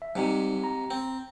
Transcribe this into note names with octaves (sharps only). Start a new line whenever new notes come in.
E5
G#2 C3 G3 D#4
A#5
C4